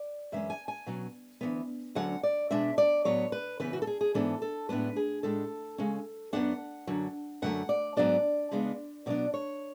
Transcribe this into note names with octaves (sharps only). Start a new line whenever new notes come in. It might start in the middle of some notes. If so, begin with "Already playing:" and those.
Already playing: D5
F#2 E3 G#3 C#4 E5
G#5
G#5
B2 F#3 C#4
D2 C#3 E3 B3
D2 D3 F#3 C#4 F#5
D5
B2 G#3 D4 E5
D5
A2 F#3 B3 C#5
B4
C#3 E3 B3 B4
F#4
A4
G#4
G#4
G#2 E3 B3 D4 A4
A4
A2 G#3 B3 D4 B4
G#4
A2 G#3 D4 A4
C#3 G#3 C#4
F#2 E3 B3 D4 F#5
F#2 D3 F#3
F#2 D3 F#3 A3 F#5
D5
G#2 F#3 B3 D4 D5
C#3 G#3 B3 D4
B2 F#3 B3 D4 D5
C#5